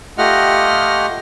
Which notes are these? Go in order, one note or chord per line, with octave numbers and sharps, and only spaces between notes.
A3 F4 G4 D#5 F#5 F6